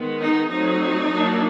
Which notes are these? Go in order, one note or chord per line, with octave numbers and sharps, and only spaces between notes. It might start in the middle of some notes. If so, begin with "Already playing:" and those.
Already playing: D#3 G#3 B3
D#4
F#3 A3 C4 D#4
F#3 A#3 D4